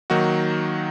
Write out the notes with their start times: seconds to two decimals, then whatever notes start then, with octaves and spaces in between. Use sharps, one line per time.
0.10 D#3 F#3 A#3 D#4 F#4